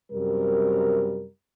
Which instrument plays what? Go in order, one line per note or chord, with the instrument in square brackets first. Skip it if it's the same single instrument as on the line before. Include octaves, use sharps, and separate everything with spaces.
[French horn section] F#2 C3 G3 A#4